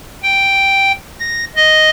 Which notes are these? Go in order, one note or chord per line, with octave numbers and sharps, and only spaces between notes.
G5
A#6
D#5